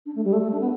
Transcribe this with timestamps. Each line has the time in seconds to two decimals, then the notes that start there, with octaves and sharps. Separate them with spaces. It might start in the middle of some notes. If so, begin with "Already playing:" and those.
0.05 D4
0.15 A3
0.24 G3
0.33 A3
0.43 A3
0.52 D4
0.60 B3